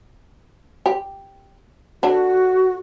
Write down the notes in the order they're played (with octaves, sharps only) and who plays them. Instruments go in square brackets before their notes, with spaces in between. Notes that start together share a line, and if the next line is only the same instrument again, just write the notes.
[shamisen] G4
[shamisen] D3 D4 [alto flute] F#4